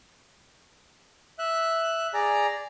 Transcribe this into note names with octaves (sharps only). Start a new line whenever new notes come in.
E5 F#6
G#4 D5 A#5